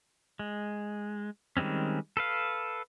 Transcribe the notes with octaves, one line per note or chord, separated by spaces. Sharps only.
G#3
D#3 G3 G#3 C4 C#4
A4 B4 F5